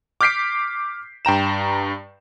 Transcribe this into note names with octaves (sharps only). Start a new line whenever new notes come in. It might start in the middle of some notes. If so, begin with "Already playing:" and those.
D6 F6 G6 B6 C7 D7
G2 G5 A#5 E7